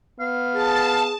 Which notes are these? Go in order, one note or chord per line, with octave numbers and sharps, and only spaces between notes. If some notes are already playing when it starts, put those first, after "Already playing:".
B3 F5
G#4 A5